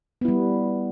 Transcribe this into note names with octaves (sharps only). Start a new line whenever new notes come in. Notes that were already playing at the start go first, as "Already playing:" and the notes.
G3 B3 E4